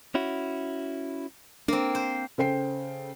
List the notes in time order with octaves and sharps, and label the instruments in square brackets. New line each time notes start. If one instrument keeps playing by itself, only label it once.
[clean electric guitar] C#4 E4 F#4
[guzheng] A#3 C4 [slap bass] D4
[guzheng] C5
[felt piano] C#3 A4 C5 G5 C7